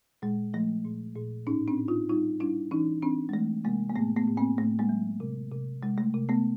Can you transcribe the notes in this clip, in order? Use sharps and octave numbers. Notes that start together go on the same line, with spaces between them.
A#2 G#3
F3 A3
A#2
A#2
A2 C#4 D#4
C4 D4
A2
D#4 F4
G3 D#4 F4
G3 D4 E4
E3 C#4 D#4
E3 C4 D4
G#3
E3 A3
C3 G#3 A#3
A#3
A2 A3 B3
A3 B3
A2
A#3 C4
A2 A3
G#3 A#3
F#3
C3
C3
C3 G#3
A3
C3
A3 B3